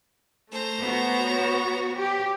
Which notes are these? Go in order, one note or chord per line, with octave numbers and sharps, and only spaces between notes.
A3 C5 A#5
B3 F#4
C#5
G4 G5